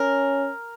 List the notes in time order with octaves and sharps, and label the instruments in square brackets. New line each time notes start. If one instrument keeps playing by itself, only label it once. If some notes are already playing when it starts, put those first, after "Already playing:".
Already playing: [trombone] C#4 [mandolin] A#4